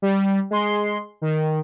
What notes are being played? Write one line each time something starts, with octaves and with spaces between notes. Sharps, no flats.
G3
G#3 C6
D#3